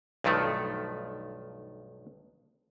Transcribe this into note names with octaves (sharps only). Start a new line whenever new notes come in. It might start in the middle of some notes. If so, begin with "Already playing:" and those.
B1 G2 D#3 F3 A3